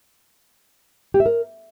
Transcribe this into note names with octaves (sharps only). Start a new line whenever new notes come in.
G4
E5
A#4